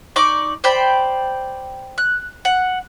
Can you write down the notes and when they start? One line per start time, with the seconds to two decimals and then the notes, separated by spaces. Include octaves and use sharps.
0.16 D#4 D5 C#6 D6
0.64 C5 D5 G5 B5
1.98 F#6
2.45 F#5